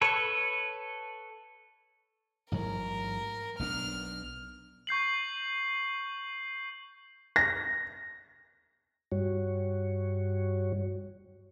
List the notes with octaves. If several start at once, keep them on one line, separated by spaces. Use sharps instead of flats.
A4 B4 C#5
A1 G#2 F#3 A#4
B1 B3 D4 F6
C#6 G6 C7 F#7
A#6
G2 G3 F#4 C#5